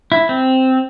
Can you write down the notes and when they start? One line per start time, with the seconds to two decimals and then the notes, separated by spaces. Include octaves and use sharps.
0.12 E4
0.29 C4